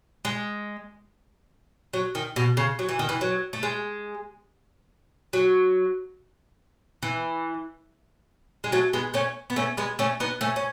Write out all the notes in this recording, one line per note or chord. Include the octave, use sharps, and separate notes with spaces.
G#3
F#3
D#3
B2
C#3
F#3
E3
D#3
E3
F#3
A3
G#3
F#3
E3
G#3
F#3 A3
G#3 B3
A3 C#4
B3
A3 C#4
G#3 B3
A3 C#4
B3 D#4
A3 C#4
C#4